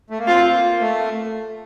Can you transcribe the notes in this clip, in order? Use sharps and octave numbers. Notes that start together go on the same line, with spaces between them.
A3
A#3
C4 F4
A#3
A3